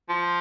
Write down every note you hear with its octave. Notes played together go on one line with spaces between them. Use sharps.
F3